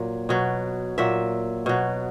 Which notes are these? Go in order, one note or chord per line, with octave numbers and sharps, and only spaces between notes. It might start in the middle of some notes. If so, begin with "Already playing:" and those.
Already playing: A#2 F#3
B2 F#3
A#2 F#3 E5
B2 F#3